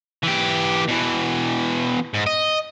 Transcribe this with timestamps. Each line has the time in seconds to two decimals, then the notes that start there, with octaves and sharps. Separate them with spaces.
0.23 E3 G4
0.88 B2 E3
2.14 G#2
2.26 D#5